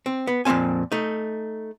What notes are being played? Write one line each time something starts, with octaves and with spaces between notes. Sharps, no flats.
C4
B3
F2 A#2 C#3 C4 G#5
A3 D#4